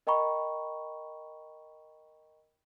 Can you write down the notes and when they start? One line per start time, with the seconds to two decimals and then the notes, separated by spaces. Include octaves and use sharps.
0.07 A#4 D#5 G5 A#5 B5 C#6